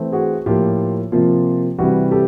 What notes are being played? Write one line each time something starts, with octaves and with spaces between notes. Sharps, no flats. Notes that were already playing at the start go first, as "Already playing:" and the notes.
Already playing: E3 A3 C4
F#4 G#4
A2 F3 A#3 F4 G4
C3 F3 A#3 F4
C3 E3 G3 F#4
G4 A4